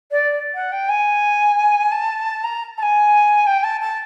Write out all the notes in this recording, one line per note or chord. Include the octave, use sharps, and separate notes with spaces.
D5
F#5
G5
G#5
A5
A#5
A5
G#5
G5
A5
A5